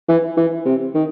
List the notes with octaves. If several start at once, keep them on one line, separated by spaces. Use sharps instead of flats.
E3
E3
C3
D#3